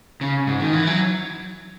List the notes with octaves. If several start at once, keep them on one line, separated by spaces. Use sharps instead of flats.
C#3
G#2
D#3
E3
F#3